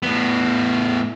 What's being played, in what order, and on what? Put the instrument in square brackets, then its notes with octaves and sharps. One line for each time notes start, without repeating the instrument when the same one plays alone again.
[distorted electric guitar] A2 B3